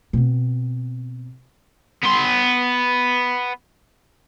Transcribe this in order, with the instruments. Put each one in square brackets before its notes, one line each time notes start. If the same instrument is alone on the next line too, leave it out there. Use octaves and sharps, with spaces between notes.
[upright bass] B2 C4
[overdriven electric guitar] B3 C6